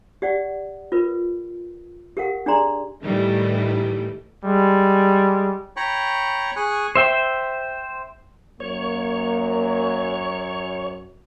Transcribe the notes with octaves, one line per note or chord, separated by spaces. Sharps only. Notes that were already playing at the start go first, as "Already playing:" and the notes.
G4 D5 F#5
F4 A#4 B4
G4 A4 A#4 F5 F#5
D4 G4 G#4 D5 A#5 C6
A2 D#3 E3 G3 A3
G3 G#3
C#5 G5 A#5 B5 C#6
G#4 G#5 C#6 F#6
C5 E5 G5
F#2 A#3 C#5